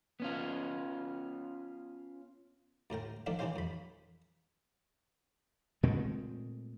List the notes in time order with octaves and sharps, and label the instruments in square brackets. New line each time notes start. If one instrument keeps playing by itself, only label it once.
[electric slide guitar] B3 C#4 F4
[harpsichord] D2 A2 A#4 G5
D#3 F3 A3 D4 D#4
D#3 E3 C#4 G4 C5 F5
F2 B5
[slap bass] A#2 G#3 A3 C4